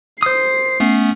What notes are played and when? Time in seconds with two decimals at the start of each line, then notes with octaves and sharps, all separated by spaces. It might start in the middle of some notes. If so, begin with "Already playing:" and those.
0.23 C5 D#6 C7
0.80 A3 B3 C#4